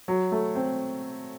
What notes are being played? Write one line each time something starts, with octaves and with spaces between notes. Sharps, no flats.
F#3
A3
C4